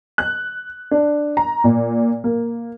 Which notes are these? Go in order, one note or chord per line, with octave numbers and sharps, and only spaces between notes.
F#6
D4
A#5
A#2
A#3